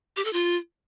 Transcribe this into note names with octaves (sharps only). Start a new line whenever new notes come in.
G4
A4
F4